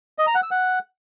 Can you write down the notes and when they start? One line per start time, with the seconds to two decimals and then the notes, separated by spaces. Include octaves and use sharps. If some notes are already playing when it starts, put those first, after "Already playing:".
0.18 D#5
0.27 A#5
0.35 F#5
0.43 E6
0.51 F#5